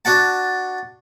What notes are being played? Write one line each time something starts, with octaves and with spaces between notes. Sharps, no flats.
D4 F#4 F#5 A5